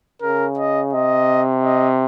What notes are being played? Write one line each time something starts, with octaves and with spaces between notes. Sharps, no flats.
C#3 A#4
D#5
C3 D#5
D#5